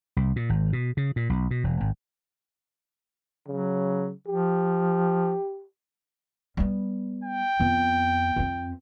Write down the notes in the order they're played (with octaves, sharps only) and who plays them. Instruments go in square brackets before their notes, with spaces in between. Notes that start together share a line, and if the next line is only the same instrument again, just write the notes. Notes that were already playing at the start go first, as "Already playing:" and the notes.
[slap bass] C2
A#2
G#1
B2
C#3
A#2
B1
B2
E1
G#1
[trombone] C#3 [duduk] F#3
[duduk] F3 [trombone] G4
[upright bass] G3 B3
[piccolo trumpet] G5
[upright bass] F2 B3
F2 C4